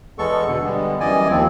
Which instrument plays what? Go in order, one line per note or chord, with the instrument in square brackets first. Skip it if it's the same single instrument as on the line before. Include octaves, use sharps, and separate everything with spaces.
[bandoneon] E2 G#3 B3 A4 C#6
B2 D3
D3 G3 G#3 B3
F#2 E3 G3 D5 D#5 G#5
D#2 F3 C4